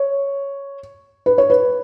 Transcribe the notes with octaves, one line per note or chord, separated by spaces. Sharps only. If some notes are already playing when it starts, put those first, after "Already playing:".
Already playing: C#5
B4
C#5
B4